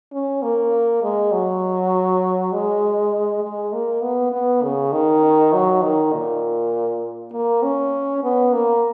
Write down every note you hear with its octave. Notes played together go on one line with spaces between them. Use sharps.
C#4
A#3
G#3
F#3
G#3
G#3
A#3
B3
B3
C#3
D#3
F#3
D#3
A#2
A#3
C#4
B3
A#3